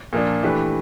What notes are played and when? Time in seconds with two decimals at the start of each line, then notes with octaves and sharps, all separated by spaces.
0.13 A#2 F3 A#3 D4
0.43 E3 A3 D4 G4 B4